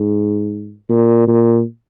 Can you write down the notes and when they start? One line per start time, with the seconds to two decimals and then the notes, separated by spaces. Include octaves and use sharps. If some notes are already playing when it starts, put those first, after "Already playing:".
Already playing: G#2
0.89 A#2
1.27 A#2